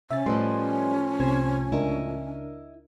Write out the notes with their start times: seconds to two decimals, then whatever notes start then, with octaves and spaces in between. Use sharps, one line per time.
0.10 C3 C#4 E5 A6
0.26 A2 F3 G3 B4 D#5 C6
1.20 C2 C3 C5 G#6
1.72 C#2 D4 E4 A#4 D#5